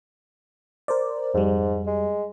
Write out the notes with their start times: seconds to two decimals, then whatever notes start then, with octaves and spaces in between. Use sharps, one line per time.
0.88 A#4 C5 D5
1.34 F2 G#2 G3
1.87 G#3